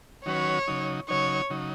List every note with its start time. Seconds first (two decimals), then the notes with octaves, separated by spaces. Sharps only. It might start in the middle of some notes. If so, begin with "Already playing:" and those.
0.26 D#3 F#3 C#4 F#4 B4 C#5
0.67 C#3 F#3 D#4
1.08 C#3 F#3 D#4 C#5
1.50 C#3 F#3 D#4